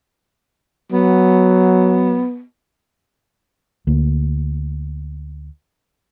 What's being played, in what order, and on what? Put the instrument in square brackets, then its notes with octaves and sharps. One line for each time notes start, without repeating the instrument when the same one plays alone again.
[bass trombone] F#3 [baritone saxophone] B3
[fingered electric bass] D2 A#3